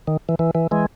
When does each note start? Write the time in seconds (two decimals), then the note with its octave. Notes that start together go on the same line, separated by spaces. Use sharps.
0.07 D#3
0.29 E3
0.39 E3
0.55 E3
0.71 E3 G#3